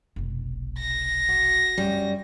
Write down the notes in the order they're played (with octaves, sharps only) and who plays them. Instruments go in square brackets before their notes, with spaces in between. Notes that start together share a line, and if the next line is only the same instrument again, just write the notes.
[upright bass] F1 B1
[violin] A#6
[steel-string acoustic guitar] F#4
[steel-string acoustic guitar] F#2 G3 [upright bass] C#3